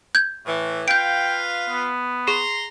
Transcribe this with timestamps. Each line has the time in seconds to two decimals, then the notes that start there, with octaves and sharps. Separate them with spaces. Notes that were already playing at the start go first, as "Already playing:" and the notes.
0.15 G6 G#6
0.46 A2 E3
0.88 F4 B4 F5 G5 G6 D7
1.69 B3
2.28 G#4 A#5 C6